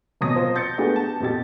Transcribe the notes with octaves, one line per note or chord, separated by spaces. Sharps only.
F1 B2 F#3 D#6 A#6
F4 C5 A5
G6 A6 A#6 C#7
G#3 A3 B3 D4 G4 G#4
A5
F2 B2 G4 A6